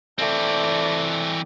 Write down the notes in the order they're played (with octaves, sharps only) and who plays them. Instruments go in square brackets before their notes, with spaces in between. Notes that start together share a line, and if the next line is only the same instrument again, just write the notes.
[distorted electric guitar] E3 C4 [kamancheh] A3 D5